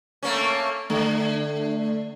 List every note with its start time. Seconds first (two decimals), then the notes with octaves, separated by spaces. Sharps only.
0.23 A3 A#3 C#4
0.90 D3 A3